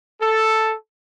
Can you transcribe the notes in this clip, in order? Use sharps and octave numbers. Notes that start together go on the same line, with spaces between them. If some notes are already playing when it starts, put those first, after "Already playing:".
A4